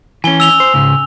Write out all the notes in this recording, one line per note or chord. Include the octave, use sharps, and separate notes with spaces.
E3 C#4 G#5 G7
E6 F7 G7
C5
C#2 G#2 C#3